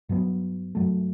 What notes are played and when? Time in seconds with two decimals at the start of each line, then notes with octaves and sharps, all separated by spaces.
0.09 G2 F#3 B3
0.75 G2 F#3 A3